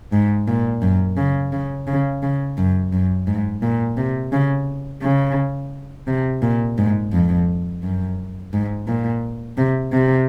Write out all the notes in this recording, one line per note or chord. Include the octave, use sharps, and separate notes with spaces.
G#2
A#2
F#2
C#3
C#3
C#3
C#3
F#2
F#2
G#2
A#2
C3
C#3
C#3
C3
A#2
G#2
F2
F#2
G#2
A#2
C3
C3